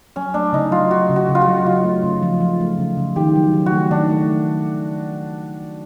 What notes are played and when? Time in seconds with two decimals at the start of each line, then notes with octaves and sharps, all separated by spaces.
0.16 F#3 C#4
0.34 A3 D4
0.53 C#3 D#4
0.72 F#3 F4
0.91 F#3 F#4
1.10 C#3
1.16 F#4
1.29 C#3
1.35 F4
1.42 F#4
1.48 F#3
1.66 C#3 F4
1.85 A3
2.03 C#3
2.23 F3
2.40 F3
2.60 A3
2.79 C#3
2.97 C#3
3.16 D#3 G4
3.36 F#3
3.53 D#3
3.66 F#4
3.72 A3
3.91 D#3 D4
4.10 A3